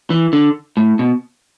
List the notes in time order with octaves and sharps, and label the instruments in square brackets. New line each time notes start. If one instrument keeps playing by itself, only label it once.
[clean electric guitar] E3
D3
A2
B2